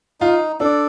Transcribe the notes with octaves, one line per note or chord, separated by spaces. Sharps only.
D#4 F4
D4 A4 D5